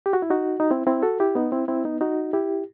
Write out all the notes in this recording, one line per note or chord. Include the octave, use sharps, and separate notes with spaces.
G4
F#4
E4
D#4 F#4
D#4
C4 E4
C4 E4
F#4 A4
E4 G4
B3 D#4
C4 E4
C4 E4
B3 D#4
D#4 F#4
E4 G4